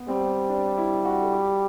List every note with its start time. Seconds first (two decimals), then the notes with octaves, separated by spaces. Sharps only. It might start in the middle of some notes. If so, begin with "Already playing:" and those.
Already playing: B3
0.08 G3 C4
0.49 D4
0.78 E4
1.05 F#4
1.22 A4
1.33 G4